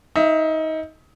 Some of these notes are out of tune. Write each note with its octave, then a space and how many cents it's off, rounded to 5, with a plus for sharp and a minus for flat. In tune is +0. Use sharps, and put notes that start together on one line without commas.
D#4 +25 E5 +10